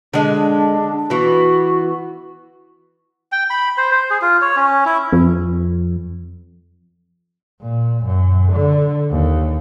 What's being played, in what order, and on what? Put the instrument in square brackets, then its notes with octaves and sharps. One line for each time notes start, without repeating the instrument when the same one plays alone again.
[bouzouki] D3 G#3 [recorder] D4
[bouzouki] E3 B3 [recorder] F#4
[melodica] G5
B5
C5
C5
G#4
F4
C#5
C#4
E4
[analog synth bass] F2
[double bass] A#2
F#2
D3
D#2